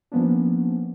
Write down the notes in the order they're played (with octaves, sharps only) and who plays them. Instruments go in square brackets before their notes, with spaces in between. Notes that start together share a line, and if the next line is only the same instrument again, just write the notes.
[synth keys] F3 A#3 B3 C#4 D4